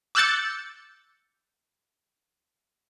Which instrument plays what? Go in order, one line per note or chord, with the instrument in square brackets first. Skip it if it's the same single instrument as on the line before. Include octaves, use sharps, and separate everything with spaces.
[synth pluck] D6 E6 F#6 G6 A6 C#7